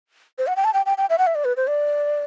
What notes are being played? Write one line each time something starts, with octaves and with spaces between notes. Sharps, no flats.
C5
F#5
G5
A5
G5
G5
G5
E5
F#5
E5
D5
B4
C5
D5